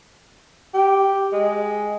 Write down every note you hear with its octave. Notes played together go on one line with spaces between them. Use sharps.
G4
G#3